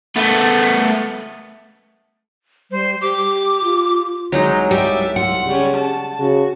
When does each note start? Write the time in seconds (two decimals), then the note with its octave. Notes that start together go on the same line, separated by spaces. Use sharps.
0.16 A3 B3
2.71 G3 C5
3.02 G4 D6
3.64 F4
4.32 C2 F#3 G#3 D#4
4.71 G3 G4 E5
5.16 F4 F#5
5.46 C#3 G3 C#4
5.76 A5
6.19 C#3 F#4